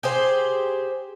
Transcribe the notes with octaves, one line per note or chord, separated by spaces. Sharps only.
G4 G#4 C5